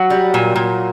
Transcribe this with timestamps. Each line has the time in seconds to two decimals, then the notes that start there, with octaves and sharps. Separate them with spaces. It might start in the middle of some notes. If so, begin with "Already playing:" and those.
Already playing: F#3 F#4
0.10 G3
0.34 A#2
0.56 A#2